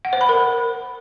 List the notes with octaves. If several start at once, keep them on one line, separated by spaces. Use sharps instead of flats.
F#5
C5
B5
A#4